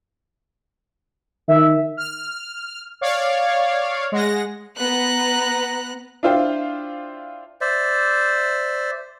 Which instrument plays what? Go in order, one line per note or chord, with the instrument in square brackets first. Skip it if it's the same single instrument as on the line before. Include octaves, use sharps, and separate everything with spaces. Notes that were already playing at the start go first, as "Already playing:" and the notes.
[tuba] D#3 [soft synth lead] E5
[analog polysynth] F6
C#5 D5 F5
G#3 F#5 A#6
[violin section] B3 A#5 F#6
[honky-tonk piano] D4 E4 F4 C5 F5 G5
[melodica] C5 D5 E5